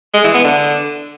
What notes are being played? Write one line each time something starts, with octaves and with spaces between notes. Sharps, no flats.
G#3
E3
B3
D3